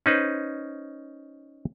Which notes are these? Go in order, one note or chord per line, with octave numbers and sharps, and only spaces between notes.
C#4 D#4 B4 C5